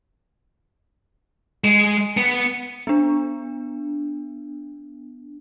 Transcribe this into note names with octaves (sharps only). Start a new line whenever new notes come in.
G#3
B3
B3 D4